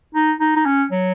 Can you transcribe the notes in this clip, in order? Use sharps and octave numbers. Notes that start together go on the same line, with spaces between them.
D#4
D#4
D#4
C#4
F#3